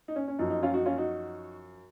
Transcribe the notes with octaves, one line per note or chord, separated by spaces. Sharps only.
D#4
C#4
C#4
F#2 F3 D#4
D#4
C#4 F4
D#4 F#4
C#4 F4
D#4 F#4